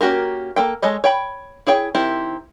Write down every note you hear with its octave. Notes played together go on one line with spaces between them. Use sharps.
A#3 C#4 F#4 G4 A#4
A#3 A4 G5
G#3 A4 C#5 D#5
C#5 G5 B5
E4 G#4 C#5 G5
D#3 C4 E4 G4